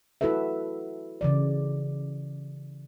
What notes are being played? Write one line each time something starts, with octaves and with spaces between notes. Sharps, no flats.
E4 F#4 A4 B4 E5
C#3 E3 D5